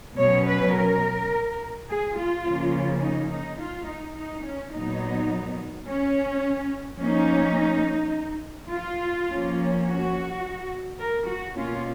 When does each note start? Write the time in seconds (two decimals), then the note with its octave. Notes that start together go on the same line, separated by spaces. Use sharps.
0.18 B2 F#3 C#4 C#5
0.47 B4
0.76 A#4
1.89 G#4
2.18 F4
2.46 C#3 F3 A#3 C#4
3.03 D#4
3.31 D#4
3.60 F4
3.88 D#4
4.17 D#4
4.45 C#4
4.73 A#2 F#3 B3 D#4
5.88 C#4
7.01 F3 A#3 C#4 D#4
8.72 F4
9.29 F3 A#3 C#4
9.86 F#4
10.99 A#4
11.27 F#4
11.56 B2 A#3 C#4 F4